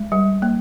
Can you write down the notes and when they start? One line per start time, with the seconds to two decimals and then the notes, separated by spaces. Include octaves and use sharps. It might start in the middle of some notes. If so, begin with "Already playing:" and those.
Already playing: G#3
0.12 G3
0.42 A#3